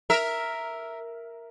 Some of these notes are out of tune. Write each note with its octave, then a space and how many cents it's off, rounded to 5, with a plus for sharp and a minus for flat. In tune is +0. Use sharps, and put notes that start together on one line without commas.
A#4 +0 E5 +0